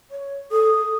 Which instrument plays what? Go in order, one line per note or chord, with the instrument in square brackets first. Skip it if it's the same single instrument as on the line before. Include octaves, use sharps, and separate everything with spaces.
[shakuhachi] C#5
[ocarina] A4 [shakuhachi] D#6